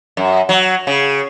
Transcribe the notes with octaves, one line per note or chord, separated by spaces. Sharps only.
F#2
F#3
C#3